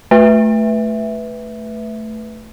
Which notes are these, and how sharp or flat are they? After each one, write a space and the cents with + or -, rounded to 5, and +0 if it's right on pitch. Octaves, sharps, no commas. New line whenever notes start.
A3 +0 B4 +0 E5 +0